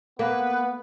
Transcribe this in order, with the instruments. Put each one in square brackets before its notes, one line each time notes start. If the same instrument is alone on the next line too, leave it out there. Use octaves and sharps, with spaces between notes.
[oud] A#3 [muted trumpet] B3 [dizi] B4